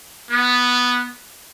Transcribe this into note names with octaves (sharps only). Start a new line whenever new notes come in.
B3